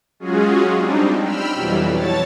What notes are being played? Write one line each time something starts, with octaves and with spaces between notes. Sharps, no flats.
F#3 G#3 C#4 F4 F#4 G#4
G3 C4 D4 D#4
G5 B5 E6 F6
F2 B2 E3 F#3 G3
C#5 A5 A6